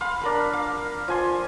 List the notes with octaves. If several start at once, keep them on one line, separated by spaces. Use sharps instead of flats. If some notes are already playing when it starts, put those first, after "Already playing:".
F5 B5 C6
D4 A#4 B5
F5
F3 G#5 C6